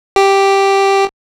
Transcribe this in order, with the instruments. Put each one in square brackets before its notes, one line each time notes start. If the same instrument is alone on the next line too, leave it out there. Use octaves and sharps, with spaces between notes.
[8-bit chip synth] G4